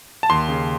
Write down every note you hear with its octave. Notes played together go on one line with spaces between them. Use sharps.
A5
D#2 C6
C#3